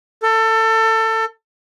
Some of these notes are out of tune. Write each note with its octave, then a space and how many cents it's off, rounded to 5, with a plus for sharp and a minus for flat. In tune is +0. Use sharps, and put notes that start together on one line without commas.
A4 +25